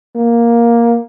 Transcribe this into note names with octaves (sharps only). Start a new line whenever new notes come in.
A#3